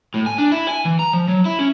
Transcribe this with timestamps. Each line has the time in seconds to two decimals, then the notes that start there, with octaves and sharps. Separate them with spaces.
0.14 A2
0.26 G#5
0.38 D4
0.52 E4
0.69 G#5
0.85 E3
0.99 A#5
1.13 F3
1.28 F#3
1.45 E4
1.59 C#4